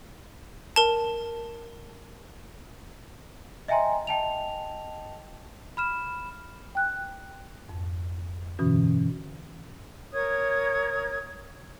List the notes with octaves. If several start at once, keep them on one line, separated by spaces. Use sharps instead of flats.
A#4 A5
D#5 E5 G5 G#5 A#5 C6
D#5 G5 A5 F7
B5 F6 E7
G5 F#6
F2 G#2
G2 B2 D3 E3 C#4 F#4
A#4 C#5 D#6 G#6